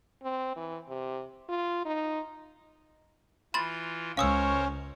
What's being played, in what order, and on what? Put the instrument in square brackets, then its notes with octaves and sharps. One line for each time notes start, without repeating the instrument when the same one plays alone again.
[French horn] C4
E3
C3
F4
D#4
[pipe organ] E3 F4 [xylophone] B5 C6 A6
[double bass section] C#2 [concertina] C#4 [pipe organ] A#4 C5 C#5 [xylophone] F5 D#6 E6